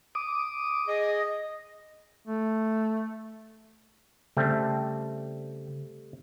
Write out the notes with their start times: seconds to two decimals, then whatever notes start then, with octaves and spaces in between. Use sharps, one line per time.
0.15 D6 D#6
0.88 G#4 D#5
2.27 A3
4.37 C#3 G3 A3 C4